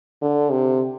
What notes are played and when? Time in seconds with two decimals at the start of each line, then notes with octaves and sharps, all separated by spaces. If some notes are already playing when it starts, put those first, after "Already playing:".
0.22 D3
0.51 C3